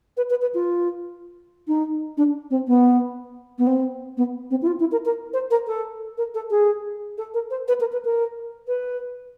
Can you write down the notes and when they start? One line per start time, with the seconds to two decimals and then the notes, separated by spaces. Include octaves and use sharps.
0.17 B4
0.30 B4
0.42 B4
0.54 F4
1.68 D#4
2.17 D4
2.51 C4
2.68 B3
3.58 B3
3.67 C4
4.17 B3
4.51 C4
4.62 E4
4.67 F4
4.80 E4
4.92 A#4
5.05 A#4
5.33 C5
5.51 A#4
5.67 A4
6.18 A#4
6.34 A4
6.50 G#4
7.18 A4
7.34 A#4
7.51 C5
7.68 B4
7.80 A#4
7.92 B4
8.05 A#4
8.68 B4